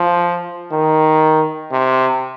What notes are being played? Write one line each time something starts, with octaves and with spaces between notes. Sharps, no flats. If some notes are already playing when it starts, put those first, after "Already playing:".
Already playing: F3
D#3
C3